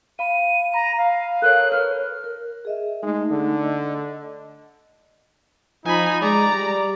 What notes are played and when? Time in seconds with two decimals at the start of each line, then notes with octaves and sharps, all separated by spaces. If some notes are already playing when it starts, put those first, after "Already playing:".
0.19 F5 B5 D#7
0.74 A#5 B5
0.98 F5
1.42 A4 A#4 C#5 F#6
1.72 A#4 B4 C#5 F6
2.24 A#4
2.65 G#4 D#5 E5
3.03 G#3 A3 D#4
3.31 D3
3.63 D#5
5.86 F3 D#4 G#5 B5
6.22 G#3 D5 A#5
6.51 G3